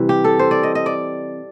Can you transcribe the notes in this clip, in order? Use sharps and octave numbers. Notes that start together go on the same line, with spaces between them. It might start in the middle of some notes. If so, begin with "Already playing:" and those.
Already playing: C3 E3 G3
G4
A4
C5
D5
D#5
D#5
D5